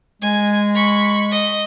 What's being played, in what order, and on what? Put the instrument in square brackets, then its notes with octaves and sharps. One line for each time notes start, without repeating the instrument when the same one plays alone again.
[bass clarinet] G#3 [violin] G#5
[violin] B5 C#6
D#5